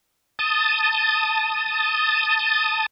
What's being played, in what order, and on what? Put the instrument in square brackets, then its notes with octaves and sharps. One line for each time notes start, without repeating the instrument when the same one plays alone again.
[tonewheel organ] A5 D#6